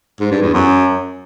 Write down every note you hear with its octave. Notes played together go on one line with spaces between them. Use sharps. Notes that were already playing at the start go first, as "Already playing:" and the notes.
G#2
G2
E2
F#2